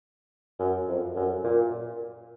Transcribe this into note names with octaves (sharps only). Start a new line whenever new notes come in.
F#2
F2
F#2
A#2